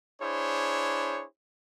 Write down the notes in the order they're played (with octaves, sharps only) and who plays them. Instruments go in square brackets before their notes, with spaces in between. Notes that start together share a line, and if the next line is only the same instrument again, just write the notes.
[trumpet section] D4 E4 G#4 C5 C#5